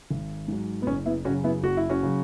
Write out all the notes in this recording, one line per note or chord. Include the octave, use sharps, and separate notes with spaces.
G#1
G#2 F#3
B3
F#1 C#4
B3 E4
F#2 C#3 F#3 C#4 F#4
B3 E4
F#1 F#4
E4
C#4 F#4
C#3 F#3